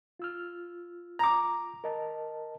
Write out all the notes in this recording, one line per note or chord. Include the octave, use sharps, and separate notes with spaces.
F4 E6 F6
A#5 D6
A#4 D#5 A5